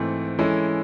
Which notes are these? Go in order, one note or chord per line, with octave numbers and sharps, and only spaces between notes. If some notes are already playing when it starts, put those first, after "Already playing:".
Already playing: G#2 E3 A3 C4 E4
E3 G#3 C#4 E4 A4